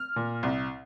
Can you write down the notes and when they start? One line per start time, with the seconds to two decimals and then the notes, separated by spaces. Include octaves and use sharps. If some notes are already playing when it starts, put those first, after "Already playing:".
Already playing: F6
0.16 A#2
0.43 C2